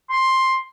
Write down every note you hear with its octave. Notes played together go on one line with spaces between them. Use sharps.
C6